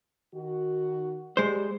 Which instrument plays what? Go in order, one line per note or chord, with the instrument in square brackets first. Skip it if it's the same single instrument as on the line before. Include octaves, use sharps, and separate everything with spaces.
[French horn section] D#3 F#4
[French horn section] G3 [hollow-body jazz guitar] G#3 C5